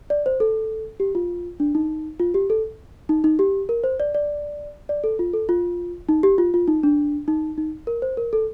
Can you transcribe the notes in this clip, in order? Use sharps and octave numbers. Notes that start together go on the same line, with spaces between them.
D5
C5
A4
G4
F4
D4
D#4
F4
G4
A4
D#4
D#4
G4
A#4
C5
D5
D5
D5
A4
F4
A4
F4
D#4
G4
F4
F4
D#4
D4
D#4
D#4
A#4
C5
A#4
A4